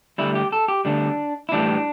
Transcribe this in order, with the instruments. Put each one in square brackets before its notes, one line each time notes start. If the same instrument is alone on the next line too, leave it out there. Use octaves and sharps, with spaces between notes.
[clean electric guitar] D2 D3 G3 E4
G4
A4
G4
D2 D3 G3 D4
E4
A2 E3 G3 D4